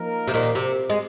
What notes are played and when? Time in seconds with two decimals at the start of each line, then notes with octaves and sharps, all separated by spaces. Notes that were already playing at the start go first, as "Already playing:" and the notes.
Already playing: F3 A#3 D#4 A#4
0.28 C3
0.34 A#2 D#3
0.55 C3
0.90 G#3